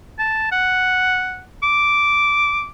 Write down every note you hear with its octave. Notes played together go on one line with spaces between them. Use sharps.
A5
F#5
D6